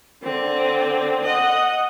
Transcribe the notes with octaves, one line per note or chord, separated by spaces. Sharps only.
D3 C4
D#5 F#5